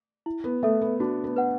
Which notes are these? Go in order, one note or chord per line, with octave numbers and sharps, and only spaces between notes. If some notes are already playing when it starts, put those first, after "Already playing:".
E4
B3
A3 A4 E5
B3
D4 F#4
B3
B4 F#5